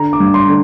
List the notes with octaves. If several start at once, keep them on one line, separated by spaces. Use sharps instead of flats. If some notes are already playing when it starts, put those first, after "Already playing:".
Already playing: D3 A#5
D6
G2
C6
D3